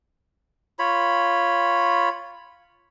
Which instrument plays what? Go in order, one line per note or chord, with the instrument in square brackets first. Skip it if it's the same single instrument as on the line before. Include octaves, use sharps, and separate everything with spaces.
[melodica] F4 C#5 B5